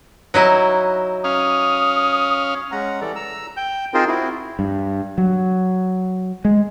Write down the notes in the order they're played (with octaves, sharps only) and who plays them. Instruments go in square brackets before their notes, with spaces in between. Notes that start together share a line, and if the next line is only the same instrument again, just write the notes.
[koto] F#3 D#4 E4
[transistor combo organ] C#4 F5 [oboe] D#6
[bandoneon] G#3 C#4 F#5 A#5
E3 G3 A4 D5
A#5 E6
G5 G6
C4 D#4 F4 G#4 A#4 C5
C4 E4 F#4
[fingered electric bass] G2
F#3
G#3